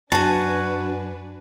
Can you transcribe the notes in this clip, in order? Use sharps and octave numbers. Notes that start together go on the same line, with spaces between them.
F#2 D4 F#4 B4 G#5 A5